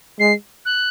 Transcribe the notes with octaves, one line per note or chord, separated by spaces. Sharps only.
G#3 C7
F#6